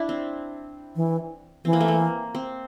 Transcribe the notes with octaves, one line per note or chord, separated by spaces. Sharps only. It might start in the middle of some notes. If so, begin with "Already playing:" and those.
Already playing: D4 E4
C4
E3
E3 C4
A#3
A3
A#3
C4